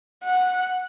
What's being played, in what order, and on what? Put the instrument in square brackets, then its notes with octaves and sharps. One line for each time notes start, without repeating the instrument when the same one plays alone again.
[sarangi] F#5